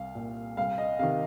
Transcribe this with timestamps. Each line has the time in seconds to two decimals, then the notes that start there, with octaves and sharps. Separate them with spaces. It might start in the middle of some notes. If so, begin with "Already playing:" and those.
Already playing: C2 F5
0.15 A#2
0.57 C2 F5
0.78 D#5
0.99 C3 D#3 F5